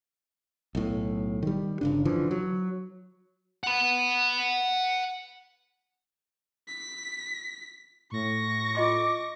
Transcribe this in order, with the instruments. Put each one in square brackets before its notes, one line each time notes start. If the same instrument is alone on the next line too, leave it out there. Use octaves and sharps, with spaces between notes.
[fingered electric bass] B1 A2
D#3 G3
G1 C#3 D4
D3 E3 F3
F#3
[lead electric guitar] F#5 B5
[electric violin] B6
[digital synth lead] A2 [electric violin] C#6 A#6
[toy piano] F4 D#5 C6 [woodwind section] D6